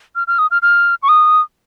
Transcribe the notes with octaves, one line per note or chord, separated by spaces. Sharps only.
F6
F6
D#6
F6
F6
C#6
D#6